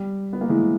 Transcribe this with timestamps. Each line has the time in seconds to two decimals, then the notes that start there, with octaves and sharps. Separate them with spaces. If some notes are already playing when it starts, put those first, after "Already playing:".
Already playing: G3
0.33 B3
0.41 A#3
0.49 E3 G#3